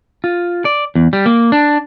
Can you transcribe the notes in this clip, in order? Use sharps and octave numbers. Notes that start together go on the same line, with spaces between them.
F4
D5
E2
G3
A#3
D4